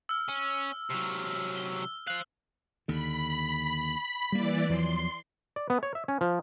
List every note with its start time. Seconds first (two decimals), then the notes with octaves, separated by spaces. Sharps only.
0.09 E6 F6
0.29 C#4
0.90 C3 F#3
1.56 G7
2.07 C5 F5 F#6 F#7
2.88 D#2 D3 B5
4.32 E3 G3 A#3 D5
4.69 E2 F3 F#3 C6
5.56 D5
5.70 B3
5.83 C#5
5.95 E5
6.08 C#4
6.21 F3